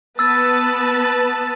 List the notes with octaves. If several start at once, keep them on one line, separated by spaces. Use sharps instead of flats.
B3 B4 A5 E6 A6